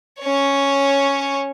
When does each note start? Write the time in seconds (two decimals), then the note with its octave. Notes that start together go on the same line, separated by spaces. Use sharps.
0.20 C#4 C#5